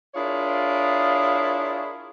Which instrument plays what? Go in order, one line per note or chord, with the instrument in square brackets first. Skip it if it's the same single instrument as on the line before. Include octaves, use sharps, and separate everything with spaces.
[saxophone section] D4 E4 F4 G#4 A#4 C#5